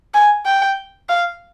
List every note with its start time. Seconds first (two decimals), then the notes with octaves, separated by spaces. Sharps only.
0.14 G#5
0.46 G5
1.09 F5